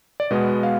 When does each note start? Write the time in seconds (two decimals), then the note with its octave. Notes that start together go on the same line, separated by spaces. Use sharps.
0.20 D5
0.31 B2 G#3 B3 D#5
0.63 F5